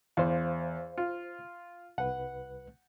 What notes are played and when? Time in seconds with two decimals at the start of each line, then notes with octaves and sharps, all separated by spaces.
0.17 E2 C5 F5
0.98 F4
1.98 C2 B4 F#5